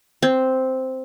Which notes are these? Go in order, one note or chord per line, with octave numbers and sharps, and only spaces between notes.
C4